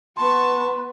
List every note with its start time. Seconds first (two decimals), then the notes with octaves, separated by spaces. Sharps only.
0.17 B3 B4 A5 C6 C#6